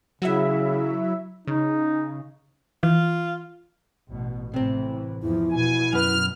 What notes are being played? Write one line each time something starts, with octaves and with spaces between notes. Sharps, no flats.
C#3 F#3 E4 E5
C#3 D#4
E3 F4
A1 B2
A2 C3 E3 C4
E2 G#2 F3 E4
B2 G#5
F#2 B4 F6